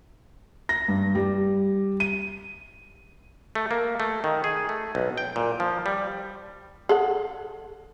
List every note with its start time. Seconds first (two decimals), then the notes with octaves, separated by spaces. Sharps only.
0.69 A#6
0.88 G2
1.15 G3
2.00 D#7
3.55 A3
3.71 A#3
4.00 A3
4.24 D#3
4.44 G#4
4.69 A3
4.95 B1
5.18 G5
5.36 A#2
5.60 F3
5.86 G3
6.89 G#4 A4 F#5